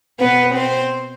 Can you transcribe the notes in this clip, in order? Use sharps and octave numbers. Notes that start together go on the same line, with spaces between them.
B2 B3 B4
C4 C5